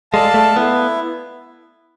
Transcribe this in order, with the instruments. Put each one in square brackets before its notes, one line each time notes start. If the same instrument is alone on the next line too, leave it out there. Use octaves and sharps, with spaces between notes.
[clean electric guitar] G#3 [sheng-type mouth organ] A4 D5 F5 A5
[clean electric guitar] A3
[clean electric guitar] B3 [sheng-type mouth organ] E4